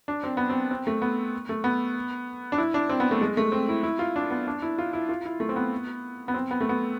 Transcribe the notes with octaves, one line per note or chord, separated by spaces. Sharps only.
D4
C4
B3
C4
C4
A3
B3
A3
B3
D4
E4
D4
C4
B3
A3
G#3
A3
C4
E4
E4
F4
D4
B3
D4
E4
F4
E4
F4
E4
A3
C4
B3
B3
C4
B3
A3
B3